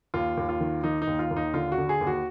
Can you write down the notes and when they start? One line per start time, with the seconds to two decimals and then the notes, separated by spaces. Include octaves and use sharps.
0.14 D#2 F4
0.37 D#2
0.49 F4
0.61 D#3
0.84 D#3 D#4
1.02 D#4
1.07 D#2
1.19 F4
1.31 D#2
1.36 D#4
1.54 D3 F4
1.72 F#4
1.77 D3
1.89 G#4
2.01 D#2
2.07 F#4